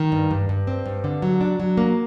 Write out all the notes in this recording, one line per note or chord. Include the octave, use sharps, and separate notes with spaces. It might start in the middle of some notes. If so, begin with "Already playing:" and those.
Already playing: D#3
G2
G2
G2
C4
G2
D3
F#3
D4
F#3
A#3